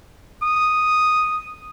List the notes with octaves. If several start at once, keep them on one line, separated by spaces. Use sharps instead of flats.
D#6